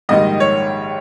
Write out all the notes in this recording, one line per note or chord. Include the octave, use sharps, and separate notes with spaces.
A#1 G#2 D#3 G3 D#5
C#5